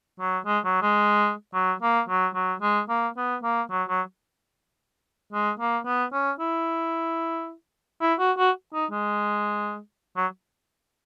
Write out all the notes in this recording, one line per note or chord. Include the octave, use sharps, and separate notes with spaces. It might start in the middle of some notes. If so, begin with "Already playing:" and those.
F#3
G#3
F#3
G#3
F#3
A#3
F#3
F#3
G#3
A#3
B3
A#3
F#3
F#3
G#3
A#3
B3
C#4
E4
E4
F#4
F#4
D#4
G#3
F#3